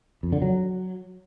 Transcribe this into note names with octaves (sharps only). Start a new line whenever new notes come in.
F2
D3
F#3